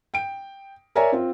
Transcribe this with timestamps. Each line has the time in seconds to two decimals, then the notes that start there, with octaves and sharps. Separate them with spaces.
0.14 G5 D7
0.95 A#4 C#5 D5 E5 G#5 A#5
1.12 C4 F4